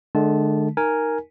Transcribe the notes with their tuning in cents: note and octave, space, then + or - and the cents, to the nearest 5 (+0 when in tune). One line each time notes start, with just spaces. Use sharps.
D3 +30 G#3 +45 A5 -15
D#4 +0 A#4 +0 G#5 +0